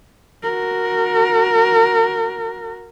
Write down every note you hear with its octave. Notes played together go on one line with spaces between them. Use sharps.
F#4 A#4